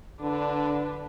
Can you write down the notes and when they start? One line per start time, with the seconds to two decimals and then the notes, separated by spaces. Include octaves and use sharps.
0.20 D3 D4 B4